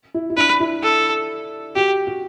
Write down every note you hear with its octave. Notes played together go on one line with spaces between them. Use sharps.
E4
E4
D4 B4
E4
A4
F#4 G4
F#4